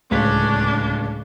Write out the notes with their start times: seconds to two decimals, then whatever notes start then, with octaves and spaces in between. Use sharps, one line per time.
0.11 D1 C#2 C#4 D4 B6